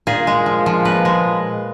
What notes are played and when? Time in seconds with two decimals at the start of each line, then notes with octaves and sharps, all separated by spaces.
0.07 A#2 G#4
0.27 G#3
0.46 F3
0.66 F3
0.85 A#2 B4
1.05 G#3